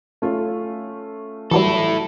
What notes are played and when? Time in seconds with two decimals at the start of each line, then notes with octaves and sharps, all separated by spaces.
0.22 A3 C#4 F4
1.51 E3 F#3 G3 E4 A4